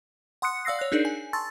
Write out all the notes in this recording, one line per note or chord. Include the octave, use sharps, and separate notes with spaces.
F#5 C6 D#6 F#6 C#7
D5 F5 E6 A#6 C7
C#5 F#6
D4 D#4 G#4 A#4 D5
G#5
A5 C6 C#6 E6 A6